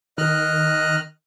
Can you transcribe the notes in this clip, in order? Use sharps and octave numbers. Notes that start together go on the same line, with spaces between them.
D#3 D#5 F6 F#6